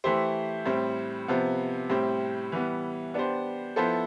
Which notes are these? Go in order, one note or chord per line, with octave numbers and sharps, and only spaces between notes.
E3 A3 E4 G4 C5
A2 G3 C4
C3 F3 B3
A2 G3 C4 G4
E3 G3 B3
B3 D4 G4 C5
F3 B3 E4 A4 C5